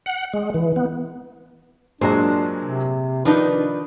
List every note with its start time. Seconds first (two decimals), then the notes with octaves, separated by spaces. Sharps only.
0.06 F#5
0.33 G#3
0.54 E3
0.76 B3
2.01 A#2 F#3 G#3 A#3 D4 C5
2.62 C3
3.25 D#3 F3 D4 D#4 B4